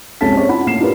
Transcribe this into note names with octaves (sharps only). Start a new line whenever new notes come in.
C2 G#3 C#4 A4 A5 B6
C4 G#4 C#5
C#4 E4 F4 F#5 B5
A2 A#3 C7 E7
D4 E4 F4 G4 A#4 B4